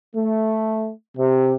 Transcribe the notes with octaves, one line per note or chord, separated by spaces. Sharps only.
A3
C3